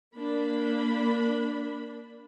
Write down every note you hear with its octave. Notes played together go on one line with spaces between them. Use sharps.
A#3 D4 B5